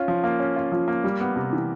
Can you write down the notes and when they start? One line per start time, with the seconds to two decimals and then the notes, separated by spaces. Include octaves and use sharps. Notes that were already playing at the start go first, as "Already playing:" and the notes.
Already playing: C#4 F4
0.08 F3
0.24 A#3
0.40 C#4
0.56 F4
0.72 F3
0.88 A#3
1.04 G3
1.20 B3
1.36 C3
1.53 E3